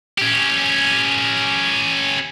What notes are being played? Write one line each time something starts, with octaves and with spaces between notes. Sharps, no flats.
C#4 G4